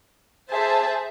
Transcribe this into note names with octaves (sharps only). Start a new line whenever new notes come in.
G#4 C5 E5 A5